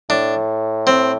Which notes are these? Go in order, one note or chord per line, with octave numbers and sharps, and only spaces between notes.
A2 D4
C4